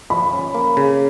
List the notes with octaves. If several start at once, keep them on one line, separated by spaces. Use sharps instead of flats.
F3 B5
C#4
A#3
C#3